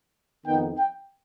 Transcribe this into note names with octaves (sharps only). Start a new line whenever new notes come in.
F2 D#3 B3 D#4 G5
G5